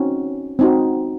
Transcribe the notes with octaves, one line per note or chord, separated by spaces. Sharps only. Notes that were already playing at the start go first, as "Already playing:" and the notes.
Already playing: C4 C#4 D#4 F#4
C4 D#4 F#4